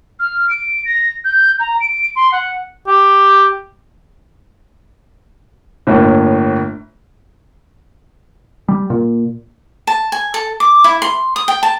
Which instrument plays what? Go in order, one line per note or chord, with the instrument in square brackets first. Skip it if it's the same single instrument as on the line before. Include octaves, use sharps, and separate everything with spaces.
[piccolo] F6
D7
A#6
G6
A#5
D7
C6
F#5
[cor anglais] G4
[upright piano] G1 A2 A#3
[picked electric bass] G3
A#2
[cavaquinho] A5
G#5
A4
D6
E4
C6
D#6
G5
A5